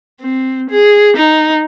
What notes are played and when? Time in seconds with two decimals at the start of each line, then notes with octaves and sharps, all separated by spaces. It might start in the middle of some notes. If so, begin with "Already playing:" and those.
0.21 C4
0.70 G#4
1.16 D#4